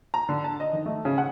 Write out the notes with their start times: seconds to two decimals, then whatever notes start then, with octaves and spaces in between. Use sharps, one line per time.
0.14 A#5
0.29 D3
0.44 A5
0.60 D#5
0.73 D#3
0.86 A3
1.05 C#3
1.18 F#5